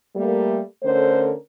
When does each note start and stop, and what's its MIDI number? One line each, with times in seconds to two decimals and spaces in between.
0.16 0.60 55
0.16 0.60 57
0.16 0.60 58
0.83 1.33 50
0.83 1.33 57
0.83 1.33 61
0.83 1.33 70
0.83 1.33 72
0.83 1.33 73